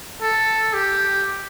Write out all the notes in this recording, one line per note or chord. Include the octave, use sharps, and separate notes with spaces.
A4
G4